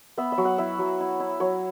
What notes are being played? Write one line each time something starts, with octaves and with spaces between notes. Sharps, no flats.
B3 E5
E5
F#3
F#5
E4 E5
F#3
E4
E4
F#3 C#5